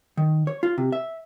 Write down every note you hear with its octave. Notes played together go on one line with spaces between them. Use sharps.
D#3
C#5
F4
C3
E5